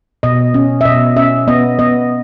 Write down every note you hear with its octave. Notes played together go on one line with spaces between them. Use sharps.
B2 D#5
C#4
E5
B2 D#5
C#4 E5
B3 D#5
B3 D#5